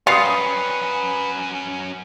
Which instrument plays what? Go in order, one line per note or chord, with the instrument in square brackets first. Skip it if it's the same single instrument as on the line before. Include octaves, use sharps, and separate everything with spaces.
[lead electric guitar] F#2 C#4 [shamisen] G3 F4 [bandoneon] B4 [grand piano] D#6 C7 C#7